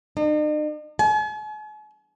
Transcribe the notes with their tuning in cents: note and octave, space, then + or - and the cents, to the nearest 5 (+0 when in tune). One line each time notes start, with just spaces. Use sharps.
D#4 -45
G#5 +45